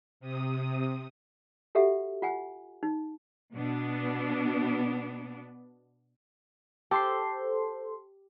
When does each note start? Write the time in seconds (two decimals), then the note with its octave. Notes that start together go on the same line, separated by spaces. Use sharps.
0.20 C3 D#6
1.75 F#4 G4 A4 E5 F#5
2.22 F4 F#5 G#5
2.83 D#4
3.55 B2 B3 D4
6.91 G4 A4 C5 C6